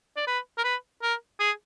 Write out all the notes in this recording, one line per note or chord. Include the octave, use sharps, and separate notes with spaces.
D5
B4
A#4
B4
A#4
G#4